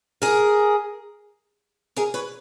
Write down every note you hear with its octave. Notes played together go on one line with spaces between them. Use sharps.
G#4 A#4
G#4 A#4
B4 C#5